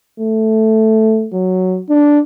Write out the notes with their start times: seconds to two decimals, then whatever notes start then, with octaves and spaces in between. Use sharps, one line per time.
0.20 A3
1.33 F#3
1.90 D4